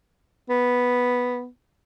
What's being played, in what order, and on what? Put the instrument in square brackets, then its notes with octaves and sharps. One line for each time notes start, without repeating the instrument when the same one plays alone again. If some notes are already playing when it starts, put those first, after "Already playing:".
[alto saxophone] B3